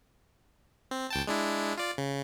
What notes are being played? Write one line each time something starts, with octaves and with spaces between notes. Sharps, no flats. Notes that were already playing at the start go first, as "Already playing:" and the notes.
C4
C#2 G5 A5
G#3 D4 E4
F4 D5
C#3